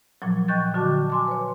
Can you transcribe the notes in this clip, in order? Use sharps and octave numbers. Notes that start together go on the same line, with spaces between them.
A#2 F3 F#3
D#5 G5 C#6 F#6 G6 A6
D3 F#4 A5 D6
G#5 C6 D6
B4 C#5